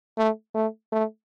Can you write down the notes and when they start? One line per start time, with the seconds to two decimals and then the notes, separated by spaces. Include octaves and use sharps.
0.18 A3
0.55 A3
0.92 A3